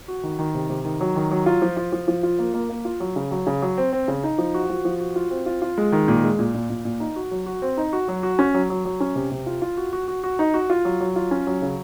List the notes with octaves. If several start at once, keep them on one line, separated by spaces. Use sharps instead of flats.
F#4
D#3
D#3
C3
C3
D#3
F#3
D#3
F#3
F4
F3
F4
F3
F3
F4
A#3
A#3
A#3
F4
F#3
C#3
F#3
C#3
F#3
C4
C4
C#3
D#4
F3
F#4
F3
F3
F#4
F4
C4
F4
F4
G#3
D#3
A#2
G#3
A#2
A#2
A#2
A#2
D#4
F#4
F#3
F#4
C4
D#4
F#4
F#3
F#4
C#4
F#3
F#3
F#3
C#4
C3
C3
F4
F4
F#4
F#4
F#4
F#4
D#4
F#4
F4
F#3
F#3
F4
C#4
F#3
C#3